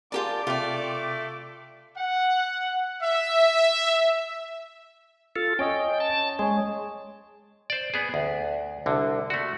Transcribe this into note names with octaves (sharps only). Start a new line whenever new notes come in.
F4 G4 G#4 A#4 D5 A5 D6
C3 A3 F4 D5 G5
F#5
E5
F4 A4
C#4 C#5 D#5 G5
A5
G#3 G#4 C#5
C5 D5
B3 G#4
D2
C2 D3
A3 F#4